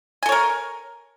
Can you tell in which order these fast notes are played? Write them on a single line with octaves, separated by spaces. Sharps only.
G#5 A4 C#5 A#4